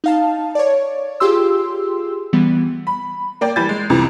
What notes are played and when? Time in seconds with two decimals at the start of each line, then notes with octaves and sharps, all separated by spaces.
0.04 D#4 F5 A5
0.55 C#5 D5
1.20 F4 G4 G#4 C6 E6
2.33 E3 G3 B3
2.87 B5
3.41 A#3 D5 G5
3.56 E3 G3 G#5 B5 G6 A6
3.69 G#3
3.90 C2 F2 C3 E3